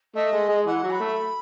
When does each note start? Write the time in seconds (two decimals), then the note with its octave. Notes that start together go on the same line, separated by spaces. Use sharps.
0.15 A3 D#5
0.33 G#3
0.49 G#3
0.66 E3 F#5
0.83 F#3
0.91 B5
1.00 A3